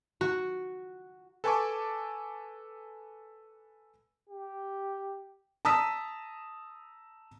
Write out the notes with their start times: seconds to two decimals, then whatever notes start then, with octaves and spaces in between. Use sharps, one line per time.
0.21 F#4
1.44 A4 B4 G#5 A5 C#6 D6
4.30 G4
5.65 A5 A#5 D#6 E6 B6